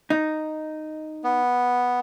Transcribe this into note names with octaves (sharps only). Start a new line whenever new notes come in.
D#4
B3